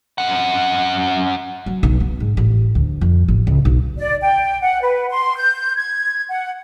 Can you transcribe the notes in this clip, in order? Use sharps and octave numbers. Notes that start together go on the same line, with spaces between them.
F#2 F#5
F#3
B1
B3
G#2
A1
D2
F2
A1
C#2
B1
D5
G5
F#5
B4
C6
G6
G#6
F#5